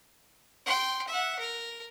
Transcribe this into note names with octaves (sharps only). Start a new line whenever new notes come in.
G5 C6
E5 F#5
A#4